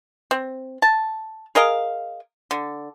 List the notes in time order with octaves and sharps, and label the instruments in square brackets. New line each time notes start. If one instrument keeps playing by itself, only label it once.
[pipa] C4
A5
G#4 A#4 D#5 F5
D3